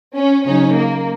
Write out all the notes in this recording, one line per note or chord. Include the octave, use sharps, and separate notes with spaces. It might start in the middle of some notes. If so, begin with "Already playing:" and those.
C#4
C#3 F#3 C#4 D#4
A#3